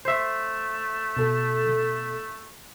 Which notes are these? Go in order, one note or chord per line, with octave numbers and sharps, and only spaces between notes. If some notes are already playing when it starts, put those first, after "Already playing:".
A3 C5 E5
B2 A4